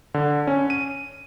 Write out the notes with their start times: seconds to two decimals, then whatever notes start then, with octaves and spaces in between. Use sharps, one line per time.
0.14 D3
0.47 C#4
0.70 D#7